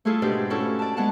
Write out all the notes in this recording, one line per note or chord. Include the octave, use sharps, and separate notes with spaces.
A3 E4 F4 G#4 A4
G#2 B2 D4 G4 D5
C#4 E4 F#4 A4
D5 A5
G#3 B3 F#5 A5